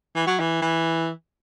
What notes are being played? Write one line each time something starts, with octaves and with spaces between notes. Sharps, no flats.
E3
F#3
E3
E3